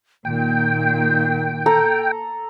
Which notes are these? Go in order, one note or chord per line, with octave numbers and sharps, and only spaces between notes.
A#2 D#3 G5
A4 A#5